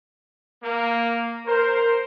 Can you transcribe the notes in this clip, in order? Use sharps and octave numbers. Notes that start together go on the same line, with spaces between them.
A#3
A#4 C5